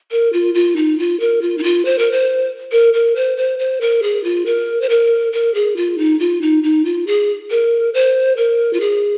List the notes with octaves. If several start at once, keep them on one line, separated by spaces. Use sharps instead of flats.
A#4
F4
F4
D#4
F4
A#4
F4
D#4
F4
C5
A#4
C5
A#4
A#4
C5
C5
C5
A#4
G#4
F4
A#4
C5
A#4
A#4
G#4
F4
D#4
F4
D#4
D#4
F4
G#4
A#4
C5
A#4
F4
G#4